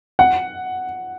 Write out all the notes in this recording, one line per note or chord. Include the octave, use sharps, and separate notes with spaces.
F#5